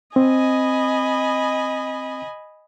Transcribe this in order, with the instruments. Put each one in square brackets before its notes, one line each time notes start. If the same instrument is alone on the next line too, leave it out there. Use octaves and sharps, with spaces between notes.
[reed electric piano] C4 [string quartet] D#5 G#5 B5